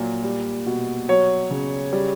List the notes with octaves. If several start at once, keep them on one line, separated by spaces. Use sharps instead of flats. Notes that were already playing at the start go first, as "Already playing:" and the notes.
Already playing: A#2 F#3
G3
B2
F#3 C#5
C#3
G3